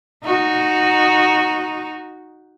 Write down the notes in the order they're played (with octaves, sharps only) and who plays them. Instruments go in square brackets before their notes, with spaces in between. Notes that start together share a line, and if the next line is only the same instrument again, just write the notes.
[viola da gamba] D#4 F#4